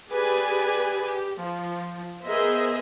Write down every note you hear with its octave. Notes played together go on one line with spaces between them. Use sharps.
G4 G#4 B4 D5 G#5
G4
F3
B3 G#4 A#4 C5 D#5 E5